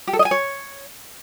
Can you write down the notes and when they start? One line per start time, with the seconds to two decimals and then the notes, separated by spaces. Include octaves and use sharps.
0.07 G4
0.13 A4
0.19 D#5
0.25 G#5
0.31 C#5